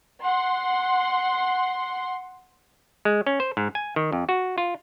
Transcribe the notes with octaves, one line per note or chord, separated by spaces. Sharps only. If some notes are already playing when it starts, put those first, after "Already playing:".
F#5 C6
G#3
C#4
C5
G#2
G#5
D#3
F2
F#4
F4